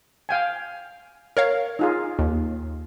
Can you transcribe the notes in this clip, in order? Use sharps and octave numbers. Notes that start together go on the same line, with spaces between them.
F5 G5 G#5
A#4 C#5 F5
D#4 F4 G#4
D#2